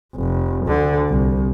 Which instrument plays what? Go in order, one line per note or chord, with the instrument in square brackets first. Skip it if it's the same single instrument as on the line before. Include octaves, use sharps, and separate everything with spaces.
[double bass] F1
D2 D3
C2